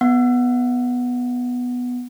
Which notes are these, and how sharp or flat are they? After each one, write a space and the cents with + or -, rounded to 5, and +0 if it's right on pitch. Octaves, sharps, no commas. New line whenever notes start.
B3 +0 F#5 +0